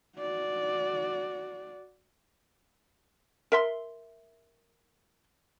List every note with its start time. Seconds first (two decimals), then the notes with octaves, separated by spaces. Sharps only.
0.18 F#4 D5
3.52 A#4 E5 C6